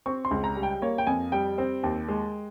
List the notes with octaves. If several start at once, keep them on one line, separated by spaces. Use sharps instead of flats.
C4 C#6
C6
C#2
A#5
G3
G5
A#3 C#5
G5
F2 G#5
G3 G5
C4
D#2
G#3